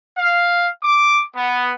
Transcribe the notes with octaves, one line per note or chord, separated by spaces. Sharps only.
F5
D6
B3